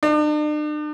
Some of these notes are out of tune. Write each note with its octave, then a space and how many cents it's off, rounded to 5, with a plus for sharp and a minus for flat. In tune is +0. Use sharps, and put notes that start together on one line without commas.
D4 +45